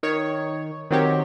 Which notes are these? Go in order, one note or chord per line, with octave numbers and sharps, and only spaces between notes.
D#3 C#5
D#3 F#3 C4 G4 C#5